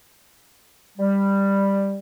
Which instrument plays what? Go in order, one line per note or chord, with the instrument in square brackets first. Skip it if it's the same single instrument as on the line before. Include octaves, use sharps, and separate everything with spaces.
[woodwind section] G3